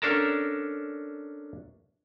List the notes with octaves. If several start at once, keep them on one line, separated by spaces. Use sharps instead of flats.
C#4 D4 A4 A#4 A5 A#5